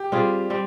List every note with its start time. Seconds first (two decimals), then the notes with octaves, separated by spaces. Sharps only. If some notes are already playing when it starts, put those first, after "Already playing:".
Already playing: G4
0.12 G3 C4 F4 G#4
0.50 G3 C4